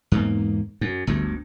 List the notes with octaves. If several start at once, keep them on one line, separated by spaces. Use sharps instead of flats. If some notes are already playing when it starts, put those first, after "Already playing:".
E2 G#2 A#3
F#2
G1 D2 G2